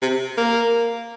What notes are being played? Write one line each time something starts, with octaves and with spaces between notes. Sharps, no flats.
C3
A#3